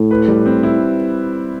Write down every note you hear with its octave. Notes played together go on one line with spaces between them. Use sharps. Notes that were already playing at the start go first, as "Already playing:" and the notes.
Already playing: A2
B4
G3
C4
E4